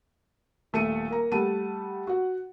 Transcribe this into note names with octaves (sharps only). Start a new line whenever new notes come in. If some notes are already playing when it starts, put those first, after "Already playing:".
D#1 A3 E5 C#7 D#7
A#3 A#4 A#5
G3 A3 F#5 A5 D#7
F#4 F#5